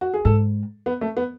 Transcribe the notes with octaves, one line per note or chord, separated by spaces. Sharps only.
F#4
G#4
G#2 A4
B3
A3
B3